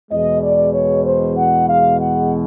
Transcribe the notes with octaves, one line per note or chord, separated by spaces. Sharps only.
E2 B2 G#3 D#5
D5
C#5
C5
F#5
F5
F#5